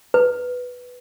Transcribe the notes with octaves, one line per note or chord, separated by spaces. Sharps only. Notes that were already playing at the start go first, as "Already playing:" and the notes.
B4